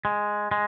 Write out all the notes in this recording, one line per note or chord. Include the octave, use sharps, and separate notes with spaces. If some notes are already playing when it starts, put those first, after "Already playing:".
G#3
G#3